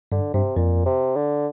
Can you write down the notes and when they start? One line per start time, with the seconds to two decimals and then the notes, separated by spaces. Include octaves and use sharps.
0.11 G2 D3
0.34 G2 C3
0.56 F2 A#2
0.85 C3
1.16 D3